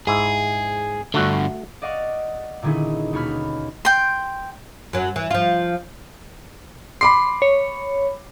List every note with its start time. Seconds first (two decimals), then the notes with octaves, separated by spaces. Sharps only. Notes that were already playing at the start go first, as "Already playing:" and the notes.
0.07 G#2 E4 G#4
1.14 G2 D3 A3 F#4
1.82 D5 D#5 F5 F#5 C#6
2.62 A#2 D3 D#3 C#4 E4 G#4
3.13 D#2 B2 C#5 B5 F6
3.85 G5 C6
4.93 F#2 F#3
5.16 E3
5.31 F3 F4
7.01 B5 C6 D6 C7
7.42 C#5